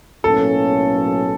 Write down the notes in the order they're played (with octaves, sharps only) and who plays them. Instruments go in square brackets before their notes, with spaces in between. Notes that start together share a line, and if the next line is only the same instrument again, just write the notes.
[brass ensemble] B1 A2 F#3 A#3 C#4 [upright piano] A4